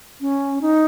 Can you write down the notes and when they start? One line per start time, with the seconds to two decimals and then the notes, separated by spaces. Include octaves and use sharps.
0.21 C#4
0.61 D#4